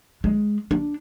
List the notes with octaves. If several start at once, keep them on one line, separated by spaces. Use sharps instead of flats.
G#3
D4